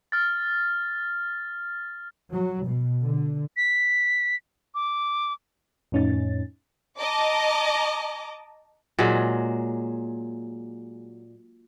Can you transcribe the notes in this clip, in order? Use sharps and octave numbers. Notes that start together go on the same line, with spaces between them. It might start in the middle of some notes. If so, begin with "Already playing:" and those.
F6 A6
F#3
B2
D3
B6
D6
F2 A2 C#4 D#4 A6
D#5 A5 A#5 D6
A#2 F#3 G#3